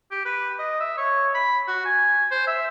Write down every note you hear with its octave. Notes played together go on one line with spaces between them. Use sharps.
G4
B4
D#5
E5
C#5
B5
F#4
G#5
C5
E5